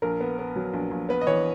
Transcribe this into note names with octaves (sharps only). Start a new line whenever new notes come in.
A#1 A#4
B3
B3
F#3
A#1
A#1
B3 B4
D#5
E3 C#5